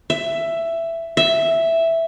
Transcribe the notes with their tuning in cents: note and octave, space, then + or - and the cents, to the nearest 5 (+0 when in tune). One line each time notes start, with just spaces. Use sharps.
E5 +10
E5 +0